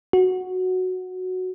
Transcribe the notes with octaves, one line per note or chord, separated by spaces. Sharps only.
F#4